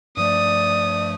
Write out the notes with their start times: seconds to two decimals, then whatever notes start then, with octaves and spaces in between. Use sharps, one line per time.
0.17 G2 F3 A3 D5 D#6